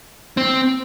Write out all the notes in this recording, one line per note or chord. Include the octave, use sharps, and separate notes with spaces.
C4